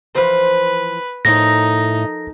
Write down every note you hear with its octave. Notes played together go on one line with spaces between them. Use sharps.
E3 F3 B4 C5
A2 F3 D#4 A4 A#4 A#6